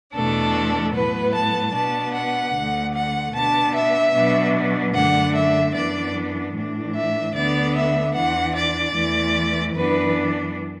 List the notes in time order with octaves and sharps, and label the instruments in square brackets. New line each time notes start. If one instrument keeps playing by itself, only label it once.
[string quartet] E2 B2 A3 D4 A4
A2 F#3 B3 B4
A5
B2 B3 D4 A5
F#5
D2 D3 A3
F#5
B2 B3 D4 A5
E5
B2 F#3 B3 D4
F#2 D3 A3 D4 F#5
E5
F#2 E3 B3 D4 D5
A2 E3 D4
E5
D2 D3 B3 D4 D5
E5
E2 E3 D4 F#5
D5
E2 E3 A3
F#2 E3 B3 D4 B4